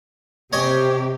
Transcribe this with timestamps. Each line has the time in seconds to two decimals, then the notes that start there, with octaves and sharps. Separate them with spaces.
0.53 C3 G4 C#5 D#5 G#5